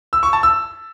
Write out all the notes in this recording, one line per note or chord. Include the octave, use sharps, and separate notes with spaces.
E6
C#6
A5
E6